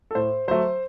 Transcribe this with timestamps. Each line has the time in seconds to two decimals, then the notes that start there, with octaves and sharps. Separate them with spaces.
0.11 A4
0.15 A2 C5
0.48 F#3 A3 C5